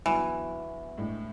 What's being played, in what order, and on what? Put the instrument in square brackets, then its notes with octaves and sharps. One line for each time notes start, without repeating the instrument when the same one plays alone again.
[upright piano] E2 D3 F#3 [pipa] E3
[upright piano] A2 G#3 D4